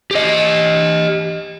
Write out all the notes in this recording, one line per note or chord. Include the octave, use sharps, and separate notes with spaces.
G4 D#5